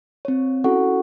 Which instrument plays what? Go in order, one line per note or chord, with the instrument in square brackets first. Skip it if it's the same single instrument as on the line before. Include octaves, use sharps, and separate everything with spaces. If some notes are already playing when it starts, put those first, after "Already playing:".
[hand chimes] C4 C#5
C#4 E4 F#4 A4 F#5 C#6